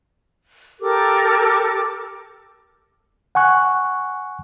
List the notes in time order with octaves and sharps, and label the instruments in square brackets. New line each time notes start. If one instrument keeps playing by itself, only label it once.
[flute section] G4 A4 A#4 D6
[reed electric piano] F#5 G#5 C#6 F#6